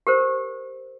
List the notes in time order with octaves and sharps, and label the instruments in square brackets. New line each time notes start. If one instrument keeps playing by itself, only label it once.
[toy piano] G4 A#4 C5